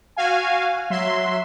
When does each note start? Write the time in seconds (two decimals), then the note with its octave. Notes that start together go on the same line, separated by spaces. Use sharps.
0.16 F#4 F5 G#5
0.90 F#3 E5 C6